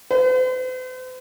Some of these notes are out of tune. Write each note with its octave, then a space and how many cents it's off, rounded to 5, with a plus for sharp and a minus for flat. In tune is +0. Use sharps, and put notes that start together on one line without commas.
C5 -45